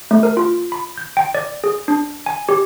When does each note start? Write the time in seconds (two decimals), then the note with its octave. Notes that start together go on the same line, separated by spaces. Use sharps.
0.11 A3
0.23 A#4
0.37 F4
0.72 B5
0.98 G6
1.17 G5
1.35 D5
1.64 G#4
1.88 D4
2.26 G#5
2.49 G4